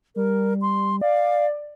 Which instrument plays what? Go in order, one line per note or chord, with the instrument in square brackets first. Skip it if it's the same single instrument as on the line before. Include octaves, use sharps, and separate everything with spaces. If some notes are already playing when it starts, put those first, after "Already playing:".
[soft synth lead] G3 [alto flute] A#4
[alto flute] C6
[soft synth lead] D5 [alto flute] F5